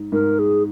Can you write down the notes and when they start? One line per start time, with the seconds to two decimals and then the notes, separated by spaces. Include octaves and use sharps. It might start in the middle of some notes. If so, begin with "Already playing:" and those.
Already playing: G#2
0.12 G#2 A#4
0.39 G#4